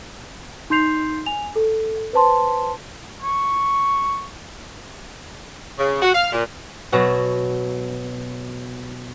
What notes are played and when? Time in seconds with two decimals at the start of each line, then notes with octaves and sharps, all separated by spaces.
0.70 D#4 C6 G6 C7 F7
1.26 G#5 F7
1.56 A4
2.13 B4 C5 A5 C6
3.23 C#6
5.79 C#3
6.02 F#4
6.14 F5
6.32 A#2
6.92 B2 F#3 F#4